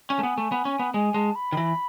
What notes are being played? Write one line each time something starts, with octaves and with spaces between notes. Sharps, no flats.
C#4 G#5
A3
B3
A3
B3
C#4
B3
G#3 G#5
G#3 A5
B5
D#3
E3